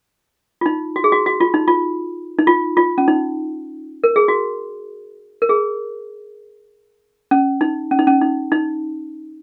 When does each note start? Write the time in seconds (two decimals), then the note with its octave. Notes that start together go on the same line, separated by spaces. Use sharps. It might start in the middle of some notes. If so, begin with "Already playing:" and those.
0.61 F4
0.66 D#4
0.96 F#4
1.04 G#4
1.12 F#4
1.26 F#4
1.40 F4
1.54 D#4
1.68 F4
2.39 D#4
2.47 F4
2.77 F4
2.98 C#4
3.08 D#4
4.04 A#4
4.16 G#4
4.28 F#4
5.42 A#4
5.49 G#4
7.31 C#4
7.61 D#4
7.91 C#4
7.99 D#4
8.07 C#4
8.21 D#4
8.52 D#4